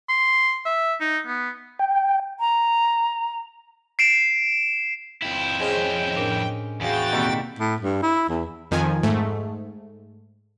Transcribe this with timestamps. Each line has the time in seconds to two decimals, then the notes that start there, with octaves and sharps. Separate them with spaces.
0.09 C6
0.65 E5
1.01 D#4
1.26 B3
1.79 G5
2.40 A#5
3.99 C7 D7 E7
5.22 F2 E4 G5
5.60 G#3 C#4 G#4 C5
6.16 A2 D4 A#4
6.81 E2 F#4 G#4 F5 G5 G#5 A6
7.11 B2 D#3 G3 A#3 C4 E4
7.59 A2
7.80 G2
8.02 E4
8.28 E2
8.71 F2 D#3 F3 G#5
9.03 G#2 A3